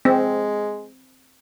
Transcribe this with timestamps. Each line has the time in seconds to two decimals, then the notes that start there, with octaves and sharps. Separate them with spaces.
0.05 G#3 C4